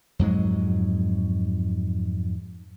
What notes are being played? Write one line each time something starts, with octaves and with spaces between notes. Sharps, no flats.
F2 G#2 F#3 G#3